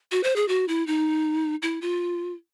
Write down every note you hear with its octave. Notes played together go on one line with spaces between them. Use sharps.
F#4
C5
G#4
F#4
E4
D#4
E4
F4